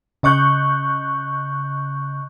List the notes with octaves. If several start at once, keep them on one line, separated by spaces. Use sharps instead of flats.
C#3 D#5 C#6 F#6 G6